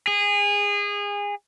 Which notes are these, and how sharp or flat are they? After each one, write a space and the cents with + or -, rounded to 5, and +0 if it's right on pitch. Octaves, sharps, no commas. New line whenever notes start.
G#4 -25